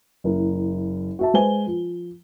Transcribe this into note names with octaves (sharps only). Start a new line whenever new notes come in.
F#1 E4 A#4
F#4 E5 A5
G#3 B4 C5 G#5 G7
F3